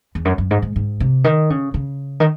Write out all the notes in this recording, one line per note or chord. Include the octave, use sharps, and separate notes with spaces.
E2
F#2
F#2
G#2
G#2
G#2
C3
D#3
C#3
C#3
D#3